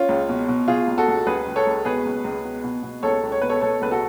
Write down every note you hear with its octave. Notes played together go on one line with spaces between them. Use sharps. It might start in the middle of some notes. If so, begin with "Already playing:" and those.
Already playing: C#4 F4
C#2
B2
B2
B2 F4 G#4
C#2
F#4 A4
C#2
C#2 G#4 B4
C#2
A4 C#5
C#2
B2 G#4 B4
C#2
C#2
B2
B2
B2
C#2 A4 C#5
C#2
C#5
B2 B4
A4 C#5
B2 A4 C#5
C#2 B4
F#4 A4